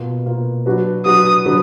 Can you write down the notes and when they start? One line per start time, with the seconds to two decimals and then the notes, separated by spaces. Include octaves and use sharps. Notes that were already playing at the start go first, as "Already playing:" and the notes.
Already playing: B2 A#3 F4 B4
0.26 B2 A#3 F4 B4
0.66 F#3 D4 F#4 B4
1.05 F#3 D4 F#4 B4 D#6
1.45 D3 F#3 D4 F#4 B4